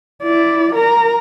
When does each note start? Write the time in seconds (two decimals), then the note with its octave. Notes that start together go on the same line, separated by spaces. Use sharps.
0.23 E4 D5
0.74 A#4 A#5